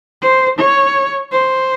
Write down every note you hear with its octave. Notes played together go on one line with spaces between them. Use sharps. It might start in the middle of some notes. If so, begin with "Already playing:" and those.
C5
C#5
C5